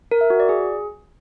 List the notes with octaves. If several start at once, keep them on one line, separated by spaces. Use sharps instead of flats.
A#4
E5
F#4
D5
G#4